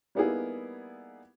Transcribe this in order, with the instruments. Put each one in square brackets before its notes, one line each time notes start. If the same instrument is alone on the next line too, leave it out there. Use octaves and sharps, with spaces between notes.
[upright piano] G3 A#3 B3 D#4 E4 G#4